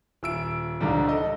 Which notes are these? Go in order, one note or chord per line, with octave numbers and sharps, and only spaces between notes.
D#1 E6 D7
C#2 G#2 D3 G3
A4 D#5